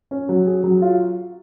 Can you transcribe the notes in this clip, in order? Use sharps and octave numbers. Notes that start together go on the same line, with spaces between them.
C#4
F#3
G#4
F#3
F4